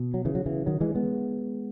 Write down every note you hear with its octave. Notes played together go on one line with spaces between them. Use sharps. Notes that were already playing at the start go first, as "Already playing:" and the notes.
Already playing: B2
F#3
C#3 E3
F#3
C#3 E3
D#3 F#3
E3 G#3
G#3 B3